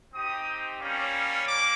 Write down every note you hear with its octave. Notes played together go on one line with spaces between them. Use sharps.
C4 D#4 G4 D#6
G3 A#3 C#4
A#3 D6